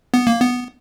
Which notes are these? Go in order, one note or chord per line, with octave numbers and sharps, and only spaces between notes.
B3
A#3
B3